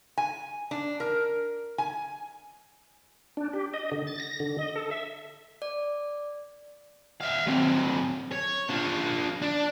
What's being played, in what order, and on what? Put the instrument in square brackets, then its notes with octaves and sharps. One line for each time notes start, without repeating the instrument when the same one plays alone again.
[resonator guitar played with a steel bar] G#5
D4
A#4
G#5
[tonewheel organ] D4
G4
D#5
D3
A6
A#6
D3
D#5
A4
E5
[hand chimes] D5
[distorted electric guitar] E5 F5
F#3 C4
C#5
D4 F4
D4